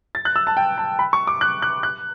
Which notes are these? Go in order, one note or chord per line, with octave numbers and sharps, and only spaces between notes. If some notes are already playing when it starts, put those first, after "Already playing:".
A6
F#6
E6
A5
G5
A5
B5
C#6
D6
F#6
F#6
F#6